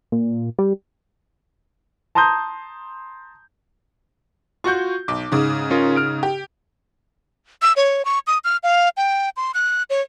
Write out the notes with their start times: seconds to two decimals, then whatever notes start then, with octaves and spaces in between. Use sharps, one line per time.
0.12 A#2
0.59 G3
2.15 A5 A#5 C6 D#6 G6
4.64 F4 F#4 F#5 C#6 G6
5.08 B1 D6
5.32 G#2 C#3
5.70 C#4 F4 A#4
5.96 F6 D7
6.23 G4
7.62 E6
7.76 C#5
8.05 C#6
8.27 D#6
8.44 F6
8.63 F5
8.97 G5
9.37 C6
9.54 F#6
9.90 C#5